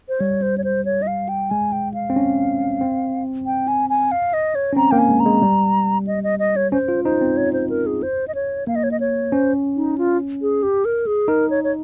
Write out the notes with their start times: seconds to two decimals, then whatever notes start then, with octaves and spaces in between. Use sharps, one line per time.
0.09 C5
0.20 G3 C#5
0.42 C5
0.58 C#5
0.64 C5
0.85 C#5
1.02 D#5
1.07 F5
1.29 G5
1.51 G#3 G#5
1.72 G5
1.94 F5
2.10 C4
2.16 C#4
2.81 C4
3.46 G5
3.68 G#5
3.90 G#5
4.12 F5
4.33 D#5
4.55 C#5
4.73 C#4
4.76 C4 A#5
4.91 A#3 G5
4.98 G#5
5.09 G#3
5.20 A#5
5.25 G#3
5.42 G3
6.07 D#5
6.24 D#5
6.39 D#5
6.56 C#5
6.72 C#4 C5
6.88 F4
7.04 D#4 C5
7.21 C4
7.37 C#5
7.53 C5
7.70 A#4
7.86 G#4
8.03 C5
8.28 D#5
8.35 C#5
8.67 A#3 F5
8.76 D#5
8.84 C#5
8.91 D#5
9.00 C#5
9.32 C#4 C5
9.76 D#4
9.98 F4
10.42 G#4
10.63 G4
10.85 A#4
11.06 G#4
11.28 D#4 A#4
11.50 C#5
11.64 C#5